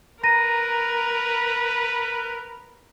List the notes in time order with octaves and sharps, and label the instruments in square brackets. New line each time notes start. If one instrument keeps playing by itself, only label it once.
[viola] A#4 [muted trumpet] B4 [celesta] A#5 A#6 D#7